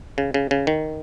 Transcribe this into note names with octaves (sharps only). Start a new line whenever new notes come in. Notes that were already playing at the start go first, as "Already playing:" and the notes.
C#3
C#3
C#3
D#3